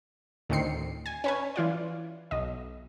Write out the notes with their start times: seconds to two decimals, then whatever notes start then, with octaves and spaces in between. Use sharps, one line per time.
0.50 D2 A2 D#3 C4 C7 C#7
1.06 G#5
1.24 C#4 B4 G#5
1.56 E3 F4 D5
2.31 B1 D#5